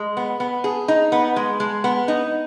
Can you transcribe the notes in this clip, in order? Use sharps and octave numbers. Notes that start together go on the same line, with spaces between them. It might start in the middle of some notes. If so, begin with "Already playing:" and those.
Already playing: G#3
B3
B3
G#4
D#4
B3
G#3
G#3
B3
D#4